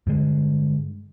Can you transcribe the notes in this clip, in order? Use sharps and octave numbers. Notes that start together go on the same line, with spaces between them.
G2 D3 G#3